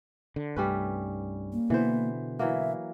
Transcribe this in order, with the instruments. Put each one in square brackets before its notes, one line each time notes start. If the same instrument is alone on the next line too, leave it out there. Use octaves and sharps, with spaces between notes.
[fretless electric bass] D3
[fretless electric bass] C2 G2 A3 [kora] G3 C#4 B4
[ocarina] A#3
[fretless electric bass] B2 D3 B3 [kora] E3 C5
[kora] E3 F#3 A#3 [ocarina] E5